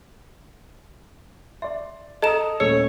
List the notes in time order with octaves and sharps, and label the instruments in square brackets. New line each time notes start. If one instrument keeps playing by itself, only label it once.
[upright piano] D5 C6 [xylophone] E5
[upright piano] A4 A#5 D#6 [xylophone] D#5 A5 E7
[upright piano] D#1 A3 C#4 [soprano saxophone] C#5 [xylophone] E6